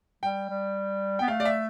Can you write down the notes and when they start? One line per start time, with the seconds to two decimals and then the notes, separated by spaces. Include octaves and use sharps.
0.23 G3 G5
0.50 G3
1.19 B3 G5
1.28 A3 F5
1.40 D5
1.45 E5